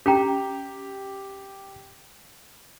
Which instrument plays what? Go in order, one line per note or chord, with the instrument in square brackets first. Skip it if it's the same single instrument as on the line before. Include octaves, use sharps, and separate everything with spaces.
[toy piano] C#4 G5 A#5 [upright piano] G4